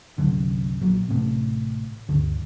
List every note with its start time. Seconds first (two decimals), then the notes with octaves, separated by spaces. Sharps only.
0.18 C2 F#2 D3
0.81 A#1 F#3
1.09 A1 A2 C3
2.09 G1 D2 D3